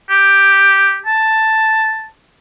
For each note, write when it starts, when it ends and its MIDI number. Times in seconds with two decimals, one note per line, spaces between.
0.09 0.97 67
1.06 2.07 81